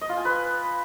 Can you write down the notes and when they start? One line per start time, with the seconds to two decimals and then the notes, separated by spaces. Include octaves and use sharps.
0.01 D#5
0.09 F4
0.17 G#5
0.25 B4